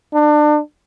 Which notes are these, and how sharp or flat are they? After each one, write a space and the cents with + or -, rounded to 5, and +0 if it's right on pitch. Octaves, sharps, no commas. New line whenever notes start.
D4 +30